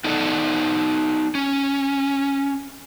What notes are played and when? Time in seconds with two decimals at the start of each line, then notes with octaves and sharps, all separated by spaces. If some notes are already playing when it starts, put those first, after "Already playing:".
0.04 B3 D#4 A4 D5 F#5
1.35 C#4